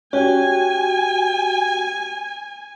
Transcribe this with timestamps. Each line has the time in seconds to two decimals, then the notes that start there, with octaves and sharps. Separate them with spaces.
0.13 C#4 F#4 G4 G5 G#5